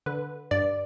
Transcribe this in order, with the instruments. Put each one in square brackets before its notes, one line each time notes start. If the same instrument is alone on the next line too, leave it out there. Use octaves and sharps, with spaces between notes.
[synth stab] D3 B4
G2 D5